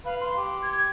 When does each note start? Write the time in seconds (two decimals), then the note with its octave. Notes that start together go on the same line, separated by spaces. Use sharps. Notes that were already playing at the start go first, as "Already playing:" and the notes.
0.05 B4 F5
0.21 C6
0.37 G4
0.62 G#6